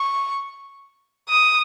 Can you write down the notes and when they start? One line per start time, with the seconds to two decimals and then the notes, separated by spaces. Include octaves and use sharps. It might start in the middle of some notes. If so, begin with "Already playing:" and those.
Already playing: C#6
1.29 D#6